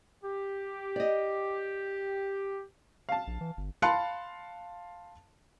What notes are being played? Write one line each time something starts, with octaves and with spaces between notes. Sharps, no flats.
G4
D5 D#5
F5 A5
A#1
E3
G1
F5 A5 B5 C6 F#6 C#7